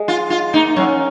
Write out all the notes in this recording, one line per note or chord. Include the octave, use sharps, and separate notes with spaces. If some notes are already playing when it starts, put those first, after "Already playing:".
Already playing: G#3
F4
F4
A#3 D#4
F#3 C#4